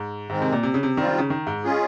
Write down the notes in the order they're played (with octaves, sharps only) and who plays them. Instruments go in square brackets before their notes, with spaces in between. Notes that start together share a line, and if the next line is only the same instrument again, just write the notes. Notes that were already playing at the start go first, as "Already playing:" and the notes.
Already playing: [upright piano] G#2
[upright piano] G#2 [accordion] D#3 G#3 C4
[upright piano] C3
A#2
C3
C#3
C3
[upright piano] D#3 [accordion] G3 C4 F4
[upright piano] D#3
C#3
D#3
G#2
[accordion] G#3 C#4 F4 G#4